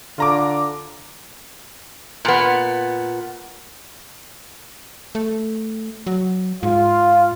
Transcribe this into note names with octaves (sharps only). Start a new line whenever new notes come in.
D3 F4 A#5 D6
A#2 B3
A3
F#3
G#2 F4